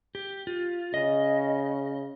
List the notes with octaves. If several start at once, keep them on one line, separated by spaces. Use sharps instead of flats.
G4
F4
C#3 D#5